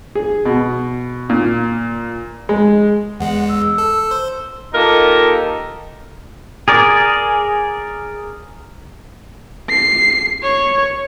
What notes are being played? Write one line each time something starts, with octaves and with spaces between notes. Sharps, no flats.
G#4
B2
A#2
G#3
E2 G#3 F#5
E6
A4
C5
A#3 D#4 F4 G4 A4 A#4
G#4 A#4 D5
C7
C#5